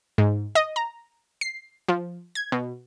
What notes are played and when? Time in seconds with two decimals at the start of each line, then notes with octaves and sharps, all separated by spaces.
0.18 G#2
0.55 D#5
0.76 A#5
1.41 C7
1.89 F3
2.35 G#6
2.52 B2